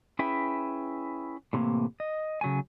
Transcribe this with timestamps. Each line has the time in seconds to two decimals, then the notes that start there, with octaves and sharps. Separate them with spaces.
0.19 C#4 E4 G#4 B4 E5 G5
1.53 A2 C3 E3 G#3 A#3
2.00 D#5
2.41 C#3 F#3 A3 G#5